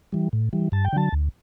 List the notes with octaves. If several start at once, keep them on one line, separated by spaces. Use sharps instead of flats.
E3 G3
A2
E3 G3
G2 A5
G5
D3 F#3 A5
D2